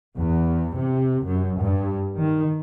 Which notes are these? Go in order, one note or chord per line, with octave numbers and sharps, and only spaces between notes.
E2
C3
F#2
G2
D#3